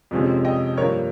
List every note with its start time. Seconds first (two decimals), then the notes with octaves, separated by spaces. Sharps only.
0.11 F2 C3 F3 G#3 C#4
0.45 D#5 G5
0.77 G2 F3 A#3 A#4 C#5